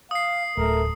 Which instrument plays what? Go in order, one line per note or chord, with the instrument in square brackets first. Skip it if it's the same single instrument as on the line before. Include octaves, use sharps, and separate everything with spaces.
[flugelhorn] F5 [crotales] D#6 C7
[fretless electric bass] D1 [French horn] A3 [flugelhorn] A#4